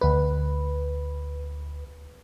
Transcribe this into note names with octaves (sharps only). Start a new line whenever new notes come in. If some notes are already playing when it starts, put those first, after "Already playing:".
D2 B4